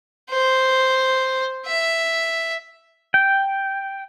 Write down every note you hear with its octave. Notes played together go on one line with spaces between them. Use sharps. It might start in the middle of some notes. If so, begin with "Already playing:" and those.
C5
E5
G5